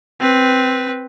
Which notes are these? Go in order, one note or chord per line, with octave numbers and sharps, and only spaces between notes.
C4 B4